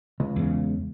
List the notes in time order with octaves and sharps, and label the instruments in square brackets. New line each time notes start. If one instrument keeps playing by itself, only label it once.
[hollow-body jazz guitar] C#2
[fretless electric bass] E2 C#3